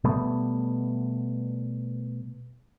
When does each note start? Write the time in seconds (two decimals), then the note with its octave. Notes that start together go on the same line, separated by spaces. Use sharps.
0.04 B2 G3 A3 B3